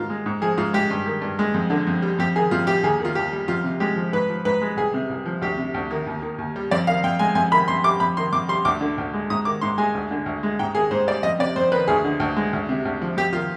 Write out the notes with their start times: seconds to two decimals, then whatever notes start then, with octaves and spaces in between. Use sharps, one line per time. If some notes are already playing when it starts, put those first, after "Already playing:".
Already playing: G#2 D#3 F4
0.10 G#3
0.26 G#2
0.41 F3 G#4
0.57 G#2 F4
0.73 G#3 G4
0.90 G2
1.06 D#3
1.22 G2
1.39 G#3
1.54 F2
1.70 D3
1.87 F2
2.02 G3
2.18 F2 G4
2.36 D#3 G#4
2.51 F2 F4
2.67 G3 G4
2.83 D#2 G#4
3.00 D#3
3.05 F4
3.15 D#2 G4
3.33 G3
3.48 F2 F4
3.64 C3
3.80 G#3 G4
3.96 F3
4.13 G#2 B4
4.30 F3
4.45 G#2 B4
4.61 G#3
4.77 C2 G#4
4.94 C3
5.10 C2
5.26 F3
5.42 D2 G4
5.58 C3
5.74 D2
5.91 D#3
6.07 D#2
6.22 D#3
6.38 D#2
6.56 G3
6.71 F2 D5
6.87 D#3 F5
7.04 F2 G5
7.19 G#3 G#5
7.35 F2 G#5
7.51 D#3 B5
7.68 F2 C6
7.84 G3 D6
8.00 F2 B5
8.17 D#3 C6
8.32 F2 D6
8.48 G3 C6
8.65 D2 D6
8.81 D3
8.98 D2
9.14 G#3
9.30 G#2 D#6
9.45 D#3 D6
9.61 G#2 C6
9.78 G#3 G#5
9.95 D2
10.11 D3
10.26 D2
10.43 G#3
10.59 G#2 G5
10.75 D#3 G#4
10.91 G#2 C5
11.07 G3 D5
11.23 F2 D#5
11.39 C3 D5
11.56 F2 C5
11.72 D#3 B4
11.88 D2 G#4
12.04 D3
12.20 D2
12.37 G#3
12.53 D2
12.69 C3
12.85 D2
13.02 F3
13.17 F2 G4
13.33 D#3 F4